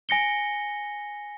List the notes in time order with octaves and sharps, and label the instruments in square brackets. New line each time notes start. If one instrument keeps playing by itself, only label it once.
[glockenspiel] G#5 A#6 C#7 G7